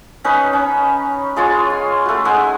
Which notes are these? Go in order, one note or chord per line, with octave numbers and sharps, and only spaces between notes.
C#4 D#4 B4
C#4
G#3 F4 C#5
G#5
A3 F#4
G#3 D#4 F#5 G#5